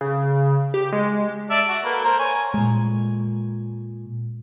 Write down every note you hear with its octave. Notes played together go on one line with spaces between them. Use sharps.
C#3
G4
G#3
D5 E5 A5
F#4
A#3 A4 B4
A#4 C5 A#5
C#5 G#5
A#2 G#3